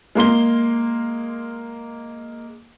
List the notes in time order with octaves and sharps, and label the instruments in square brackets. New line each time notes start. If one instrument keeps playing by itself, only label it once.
[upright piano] G#3 A#3 C6 G7